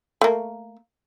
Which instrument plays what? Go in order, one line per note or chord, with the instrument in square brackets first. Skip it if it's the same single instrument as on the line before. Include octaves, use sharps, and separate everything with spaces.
[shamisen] A3 A#3